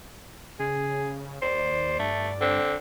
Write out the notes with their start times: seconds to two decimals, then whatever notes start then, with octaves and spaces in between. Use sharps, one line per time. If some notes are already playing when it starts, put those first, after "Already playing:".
0.59 C#3 G#4
1.42 D#2 C5 D5
1.99 G2 A3
2.41 D3 C4